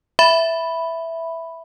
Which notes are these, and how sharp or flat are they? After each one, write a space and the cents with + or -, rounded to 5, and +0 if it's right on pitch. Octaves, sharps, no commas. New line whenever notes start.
E5 +0 B5 +0